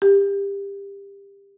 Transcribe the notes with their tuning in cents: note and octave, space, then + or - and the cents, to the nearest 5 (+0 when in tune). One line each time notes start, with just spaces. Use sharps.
G4 +25